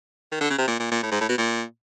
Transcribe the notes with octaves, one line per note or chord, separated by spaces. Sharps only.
D#3
D3
C#3
C3
A#2
A#2
A#2
A2
G#2
A2
B2
A#2